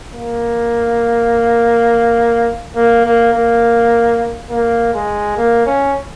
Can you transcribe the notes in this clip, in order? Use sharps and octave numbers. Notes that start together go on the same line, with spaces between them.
A#3
A#3
A#3
A#3
A#3
G#3
A#3
C#4